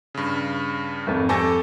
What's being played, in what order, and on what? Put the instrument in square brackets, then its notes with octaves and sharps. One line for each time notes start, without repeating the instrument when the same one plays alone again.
[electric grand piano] G2 C#3
[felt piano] G#1 F2
[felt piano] F2 G#5 A#6 [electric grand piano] G4 A4 C#6